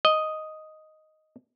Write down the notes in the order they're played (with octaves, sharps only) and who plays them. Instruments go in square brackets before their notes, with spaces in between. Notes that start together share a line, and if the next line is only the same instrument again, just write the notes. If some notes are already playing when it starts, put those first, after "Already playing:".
[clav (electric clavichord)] D#5